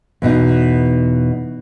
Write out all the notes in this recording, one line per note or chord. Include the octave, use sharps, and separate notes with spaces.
E2 B2 D#4